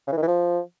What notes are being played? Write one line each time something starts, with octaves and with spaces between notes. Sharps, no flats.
C#3
E3
D#3
E3
F3